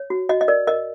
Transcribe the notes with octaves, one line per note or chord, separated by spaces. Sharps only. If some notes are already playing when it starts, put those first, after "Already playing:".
Already playing: C#5
F#4
F#4 D#5
D#5
A#4 D5
A#4 D#5